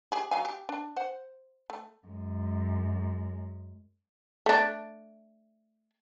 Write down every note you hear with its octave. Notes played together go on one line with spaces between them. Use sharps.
G4 G#4
F#3 F5 G#5
G4
D4
C5 F#5
A3
F#2 G#3
A3 D4